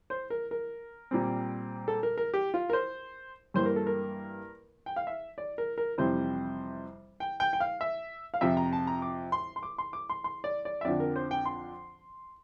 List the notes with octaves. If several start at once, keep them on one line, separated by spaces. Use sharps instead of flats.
C5
A#4
A#4
A#2 G3 C4
A4
A#4
A#4
G4
F4
A#4
C5
G2 E3 A#3 C5
A#4
A4
A#4
G5
F5
E5
D5
A#4
A#4
F2 C3 E3 G3 C5
G5
G5
G5
F5
E5
F5
F2 C3 F3 E5
A#5
A5
A#5
D6
C6
C6
D6
C6
D6
C6
C6
D5
D5
E5
F2 D3 F3 D5
A#4
C5
G5
C6